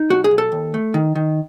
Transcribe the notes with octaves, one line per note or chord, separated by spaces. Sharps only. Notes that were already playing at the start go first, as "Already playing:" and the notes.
Already playing: D#4
B1 F#4
G#4
B1
A4
D#2
A3
D#3
D#3